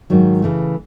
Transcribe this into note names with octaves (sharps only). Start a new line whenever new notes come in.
G#2 D#3 F#3
C#3 E3 A3